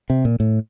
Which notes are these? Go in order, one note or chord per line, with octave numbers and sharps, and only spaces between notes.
C3
A#2
A2